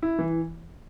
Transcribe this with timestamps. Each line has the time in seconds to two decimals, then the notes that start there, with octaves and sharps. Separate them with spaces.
0.02 E4
0.19 E3